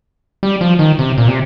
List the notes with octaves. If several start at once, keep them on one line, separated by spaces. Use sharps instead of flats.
G3
F3
D#3
C3
A#2
C3